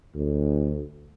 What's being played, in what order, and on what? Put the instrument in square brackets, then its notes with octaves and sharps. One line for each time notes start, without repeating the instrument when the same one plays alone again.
[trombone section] D2